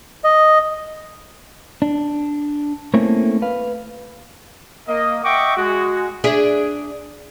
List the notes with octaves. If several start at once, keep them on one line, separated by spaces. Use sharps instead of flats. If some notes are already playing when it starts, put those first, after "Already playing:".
D#5
D4
A3 A#3 C4 C#4 E4 A4
B4 F5
A#3 D#5
D#5 E5 F#5 G5 C#6 D6
G#3 F#4
D4 G#4 E5